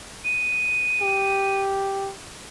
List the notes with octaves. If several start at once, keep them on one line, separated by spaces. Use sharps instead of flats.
D#7
G4